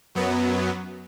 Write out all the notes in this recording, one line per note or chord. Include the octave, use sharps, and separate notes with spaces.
F#2 F#3 B3